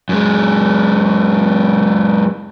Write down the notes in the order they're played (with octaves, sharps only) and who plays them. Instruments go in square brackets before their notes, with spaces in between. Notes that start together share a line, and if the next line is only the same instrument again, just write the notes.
[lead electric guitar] F#2 G#3